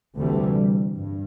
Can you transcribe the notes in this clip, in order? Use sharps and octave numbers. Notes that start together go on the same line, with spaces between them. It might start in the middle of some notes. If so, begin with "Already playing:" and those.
D2 C3 E3 G3
G2